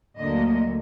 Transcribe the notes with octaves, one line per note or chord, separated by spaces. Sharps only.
D2 D3 F#3 A#3 D#5